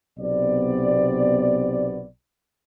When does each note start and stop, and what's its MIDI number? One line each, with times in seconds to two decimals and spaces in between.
0.19 2.06 35
0.19 2.06 48
0.19 2.06 59
0.19 2.06 74